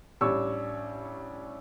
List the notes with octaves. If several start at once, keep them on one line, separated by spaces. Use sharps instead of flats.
A1 G3 D4 C#5 C#6 E6